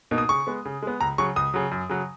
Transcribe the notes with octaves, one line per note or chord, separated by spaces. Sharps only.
B2 A#3 D#4
D#6
C#3 C#6
G#3 B3
C#3
G#3 B3
C#2 A#5
C#3 F#3 C#6
C#2 D#6
C#3 F#3
F#2
C#3 F#3